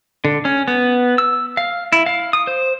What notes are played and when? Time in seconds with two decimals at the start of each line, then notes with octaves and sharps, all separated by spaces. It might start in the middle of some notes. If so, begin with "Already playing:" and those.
0.25 D3
0.45 C#4
0.68 B3
1.18 E6
1.57 F5
1.92 E4
2.06 F5
2.33 D#6
2.47 C5